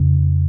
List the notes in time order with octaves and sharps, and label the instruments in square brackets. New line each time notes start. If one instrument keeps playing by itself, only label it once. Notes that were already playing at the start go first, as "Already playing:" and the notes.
Already playing: [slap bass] F2 C#3